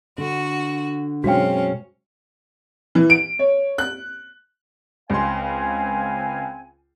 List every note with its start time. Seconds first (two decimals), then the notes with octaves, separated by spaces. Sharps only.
0.18 D3 F#4
1.24 F#2 B2 G#3 C4 C#4 F#4 F5 G5
2.95 E3
3.10 D7
3.39 C#5
3.78 F#6
5.10 C#2 C4 F5 G#5 C6